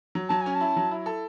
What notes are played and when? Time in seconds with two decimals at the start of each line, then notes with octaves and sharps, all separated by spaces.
0.15 F#3
0.29 F#3 A5
0.41 C#4 G#5
0.55 A5
0.61 E4
0.77 F#3
0.91 E4
1.06 A4